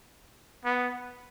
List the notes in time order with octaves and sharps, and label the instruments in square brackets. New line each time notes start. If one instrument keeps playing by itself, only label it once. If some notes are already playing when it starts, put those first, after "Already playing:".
[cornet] B3